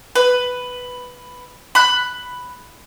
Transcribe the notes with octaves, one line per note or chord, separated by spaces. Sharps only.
B4
B5 F#6